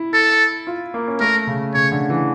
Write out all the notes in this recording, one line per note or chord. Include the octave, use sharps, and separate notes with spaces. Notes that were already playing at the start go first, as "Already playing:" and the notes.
Already playing: E4
A4
F4
A#3
C#4
A3 A#4
C#3
C#3 C#5
D3
E3